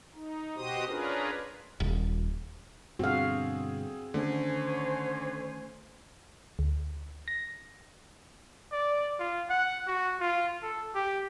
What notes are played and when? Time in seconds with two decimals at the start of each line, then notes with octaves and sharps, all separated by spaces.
0.14 D#4
0.56 B2 F#4 G4 C5 D#5 D#6
0.87 C#4 D4 F4 G#4 A#4 B4
1.80 D#1
2.99 G2 B2 D3 C4 F#4 G#4 F5
4.14 D3 D#3 A3 C#4 C5 C#5 G#5
6.59 D2
7.28 A#6
8.72 D5
9.19 F4
9.50 F#5
9.87 F#4
10.20 F4
10.62 A4
10.95 G4